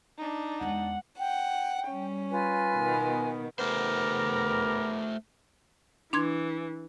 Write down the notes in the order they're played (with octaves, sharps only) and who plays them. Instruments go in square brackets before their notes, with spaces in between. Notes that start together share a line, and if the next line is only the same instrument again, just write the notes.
[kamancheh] D4 D#4
[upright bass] E2 G#3 [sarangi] F#5
[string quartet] F#5 [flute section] G5
[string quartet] G3 C#4
[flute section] F4 B4 G#5
[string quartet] B2 D#3 B3
[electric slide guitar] A3 C5 [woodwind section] B3 G4 A#4
[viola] E3 [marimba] D4 C6 G#6